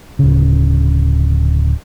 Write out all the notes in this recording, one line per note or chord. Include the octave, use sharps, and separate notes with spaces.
D1 C#3